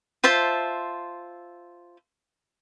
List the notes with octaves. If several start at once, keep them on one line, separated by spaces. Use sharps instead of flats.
F4 C5 E5 A5